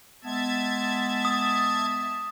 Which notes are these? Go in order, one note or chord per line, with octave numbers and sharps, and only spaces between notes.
G#3 B3 E5 A5 G#6
D#6